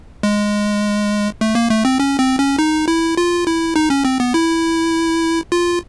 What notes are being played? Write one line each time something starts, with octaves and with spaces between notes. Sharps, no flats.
G#3
A3
A#3
A3
C4
C#4
C4
C#4
D#4
E4
F4
E4
D#4
C#4
C4
B3
E4
F4